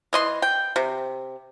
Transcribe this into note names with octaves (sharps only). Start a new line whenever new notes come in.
E3 D#5 C6
G5
C3